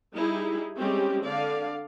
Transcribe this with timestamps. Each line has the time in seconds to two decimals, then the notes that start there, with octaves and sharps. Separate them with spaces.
0.14 G3 D#4 E4 G#4
0.77 G3 G#3 C4 C#4 G4
1.25 D3 D5 F5